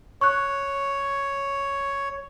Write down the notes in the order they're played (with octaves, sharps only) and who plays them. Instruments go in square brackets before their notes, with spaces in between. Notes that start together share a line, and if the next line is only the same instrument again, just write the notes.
[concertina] C#5 [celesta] C#6 F#6